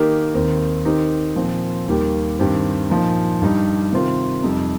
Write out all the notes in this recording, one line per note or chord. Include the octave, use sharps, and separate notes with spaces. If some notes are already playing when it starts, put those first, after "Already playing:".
Already playing: D#3 A#3 D#4 G4 A#4
D#2 D#3 C4 D#4 A#4
D#3 C4 D#4 G4 A#4
A#2 F3 C4
D#2 D#3 G3 A#3 G4
G2 D#3 C4 G4
A#2 F3 D#4
G2 G3 D#4
C3 D#3 C4 F4 A#4
F2 C3 G3 D#4